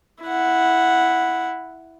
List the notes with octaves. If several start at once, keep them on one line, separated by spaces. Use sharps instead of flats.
E4 F#5